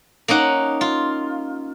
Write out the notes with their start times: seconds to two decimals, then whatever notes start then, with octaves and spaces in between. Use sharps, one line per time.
0.28 A#3 C#4 D#4 F#5
0.81 F4